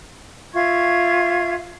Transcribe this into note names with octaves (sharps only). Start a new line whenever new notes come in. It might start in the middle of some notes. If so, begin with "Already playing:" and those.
F4 E5 C#6 G#6